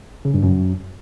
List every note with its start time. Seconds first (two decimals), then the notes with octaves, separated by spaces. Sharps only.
0.25 C#3
0.34 G2
0.43 F#2